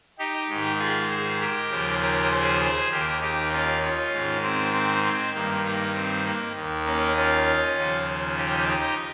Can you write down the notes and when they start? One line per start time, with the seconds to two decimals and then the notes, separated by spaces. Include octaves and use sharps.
0.19 D#4 G4
0.49 G#2 D#3
0.79 F4 G#4
1.09 G#4 C5
1.40 G4 A#4
1.71 D#2 C#3 F3
2.00 G4 A#4
2.31 G#4 C5
2.61 G#4 C5
2.92 D#2 D#3 G4 A#4
3.21 D#4 G4
3.52 C#4 F4
3.82 C#4 F4
4.13 G#2 D#3
4.43 C4
4.73 C4
5.04 C4
5.34 G2 D#3 A#3
5.64 A#3
5.94 C4
6.25 A#3
6.55 D#2 D#3
6.85 A#3 C#4
7.16 C#4 F4
7.76 D#2 C#3 F3
8.37 D#4 G4
8.67 D#4 G4